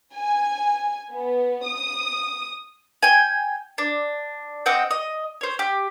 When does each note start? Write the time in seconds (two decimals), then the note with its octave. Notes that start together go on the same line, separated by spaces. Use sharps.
0.15 G#5
1.13 B3
1.67 D#6
3.03 G5 G#5
3.78 D4
4.66 C4 D#5 F#5 G5
4.91 D#5
5.41 C5 C#5
5.59 G4